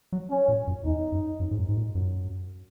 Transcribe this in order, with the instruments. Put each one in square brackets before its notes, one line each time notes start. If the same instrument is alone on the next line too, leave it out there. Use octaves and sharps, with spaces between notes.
[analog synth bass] F#3
[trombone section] C#4
[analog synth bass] A#2
F#2
[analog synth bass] E2 [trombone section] D#4
[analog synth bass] F#2
F#2
G#2
F#2
G#2
A#2
F#2